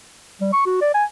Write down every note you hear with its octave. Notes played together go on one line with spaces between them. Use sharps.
G3
C#6
F#4
D5
G#5